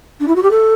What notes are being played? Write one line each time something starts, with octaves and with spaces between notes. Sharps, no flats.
D4
E4
F#4
G4
A4